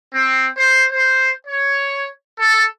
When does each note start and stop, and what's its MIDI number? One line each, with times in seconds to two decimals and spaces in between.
0.14 0.47 60
0.57 0.85 72
0.91 1.30 72
1.47 2.08 73
2.39 2.66 69